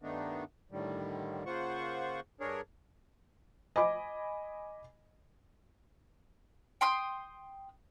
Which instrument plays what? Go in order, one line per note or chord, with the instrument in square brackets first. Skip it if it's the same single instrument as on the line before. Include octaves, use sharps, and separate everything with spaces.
[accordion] G2 D#3 A3 B3 D4 D#4
A2 D3 D#3 G3
C#3 A#3 F4 C5 F#5 C#6
G2 D4 G#4 A#4 C#5
[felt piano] D#5 G#5 B5 D6
[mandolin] G5 C6 D#6